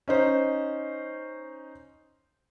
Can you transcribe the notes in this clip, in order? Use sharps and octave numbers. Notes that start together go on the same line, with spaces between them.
C#4 D#4 C5